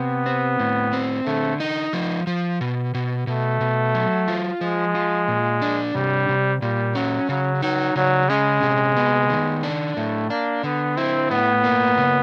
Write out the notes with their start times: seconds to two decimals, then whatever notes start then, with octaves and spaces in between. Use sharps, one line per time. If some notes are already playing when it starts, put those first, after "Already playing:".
Already playing: C3 B3
0.26 C4
0.60 A2
0.93 C4
1.26 D3 A3
1.60 D#4
1.93 F3
2.27 F3
2.61 B2
2.94 B2
3.27 B2 A3
3.61 B2
3.95 F#3
4.28 F4
4.61 F3 G#3
4.95 F4
5.28 A#2
5.62 D4
5.94 C3 G3
6.29 C3
6.62 A#2 G3
6.95 F#3 C#4
7.29 C#3 F#3
7.62 F#3 D#4
7.96 C#3 F#3
8.29 G#3 C#4
8.63 C3
8.96 B3
9.30 D#3
9.63 D4
9.96 A2 A3
10.30 A#3 D4
10.64 D3 B3
10.97 C4 E4
11.31 A2 B3
11.64 A#3
11.98 C#3